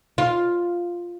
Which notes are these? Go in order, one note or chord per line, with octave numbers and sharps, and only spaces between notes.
F4